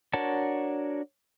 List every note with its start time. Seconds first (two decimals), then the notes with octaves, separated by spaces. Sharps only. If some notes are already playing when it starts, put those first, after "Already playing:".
0.13 D4 F#4 A#4 C#5 A5